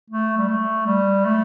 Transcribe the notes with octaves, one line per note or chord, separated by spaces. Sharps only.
A3
G3
A3
G3
A3